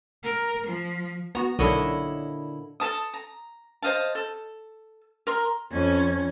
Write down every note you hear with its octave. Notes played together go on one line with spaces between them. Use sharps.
A#4
F3
B3 F#4 A#5
B1 A#2 D3 D4 E4 C#5 D#5
A4 A#4 A5 D#6
A#5
C5 D#5 F5 A5
A4
A#4 A#5 C6
F2 C#4